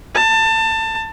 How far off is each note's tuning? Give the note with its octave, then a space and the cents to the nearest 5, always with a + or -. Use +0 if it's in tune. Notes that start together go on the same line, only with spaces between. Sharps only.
A5 +25